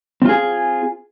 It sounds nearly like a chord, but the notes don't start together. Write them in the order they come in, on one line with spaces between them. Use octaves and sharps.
C4 F4 G#4